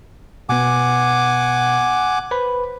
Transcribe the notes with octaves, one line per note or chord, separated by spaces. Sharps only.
B2 B3 F#5 G#5 D6
B4 C5 B5